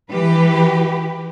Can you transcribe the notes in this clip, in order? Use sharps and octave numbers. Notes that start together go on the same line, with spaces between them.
E3 G4 B4